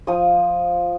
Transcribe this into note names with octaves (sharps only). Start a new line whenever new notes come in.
F3 D#6